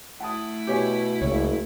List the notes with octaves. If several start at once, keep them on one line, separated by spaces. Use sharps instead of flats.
A3 E4 F#5 A5 D#6
B2 G4 C#5 G#5
F#1 C#2 C#5